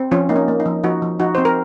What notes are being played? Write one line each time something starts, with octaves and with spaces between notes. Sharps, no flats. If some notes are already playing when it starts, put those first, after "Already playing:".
Already playing: C4
F3 C#4 F4
A#3 D#4
C#4
A#3
D#4
F3
F3 D#4 F#4
F3
F3 D#4 F#4
C4 C5
A#4